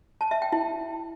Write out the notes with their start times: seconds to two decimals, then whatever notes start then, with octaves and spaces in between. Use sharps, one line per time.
0.21 A5
0.31 E5
0.42 G5
0.52 E4